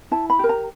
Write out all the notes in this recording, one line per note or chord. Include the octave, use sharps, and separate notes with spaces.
E4 A5
B5
G4 A#4
A#5